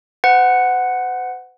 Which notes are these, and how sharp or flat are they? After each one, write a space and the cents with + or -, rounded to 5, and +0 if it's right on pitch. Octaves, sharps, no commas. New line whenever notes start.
C5 -45 F#5 +0